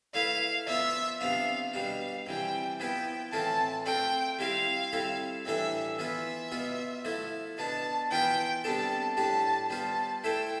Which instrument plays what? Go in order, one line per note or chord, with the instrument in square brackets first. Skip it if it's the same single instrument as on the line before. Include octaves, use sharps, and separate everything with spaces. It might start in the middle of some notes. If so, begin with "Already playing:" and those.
[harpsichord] A3 E4 B4 [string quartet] F5
[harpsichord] F3 B3 F4 [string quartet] E5
[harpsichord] C3 F3 B3 D4 [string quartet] F5
[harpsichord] B2 G3 D4 [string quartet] F5
[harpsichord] C3 E3 G3 [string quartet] G5
[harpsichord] F3 B3 E4 B4 [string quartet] G5
[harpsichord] A2 E3 A3 C4 F4 [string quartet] A5
[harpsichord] A3 C4 F4 [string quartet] G5
[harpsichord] G3 C4 E4 G4 C5 [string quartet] F5
[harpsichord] G3 C4 E4 A4
[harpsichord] A2 E3 G3 D4 A4 [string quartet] E5
[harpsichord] E3 B3 F4 B4 [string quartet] E5
[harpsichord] B2 B3 F4
F3 A3 E4
[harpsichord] B2 B3 D4 [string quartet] A5
[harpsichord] E3 B3 F4 B4 [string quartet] G5
[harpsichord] C3 G3 B3 D4 A4 [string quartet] A5
[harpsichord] A2 G3 D4 G4 [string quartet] A5
[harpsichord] G3 B3 F4 C5 [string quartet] A5
[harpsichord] A3 E4 A4 C5 [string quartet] G5